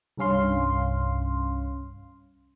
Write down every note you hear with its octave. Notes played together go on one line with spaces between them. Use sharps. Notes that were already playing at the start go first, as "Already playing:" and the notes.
C2 G2 C#4 F5 C6